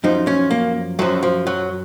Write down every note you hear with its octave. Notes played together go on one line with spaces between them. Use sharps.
F#2 F3 D#4
C#4
A#3
F#2 F3 F#3
F3
F#3